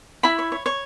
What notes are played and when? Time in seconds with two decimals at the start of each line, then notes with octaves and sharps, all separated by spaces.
0.23 E4 B5
0.39 C#5
0.52 C#5
0.66 C#5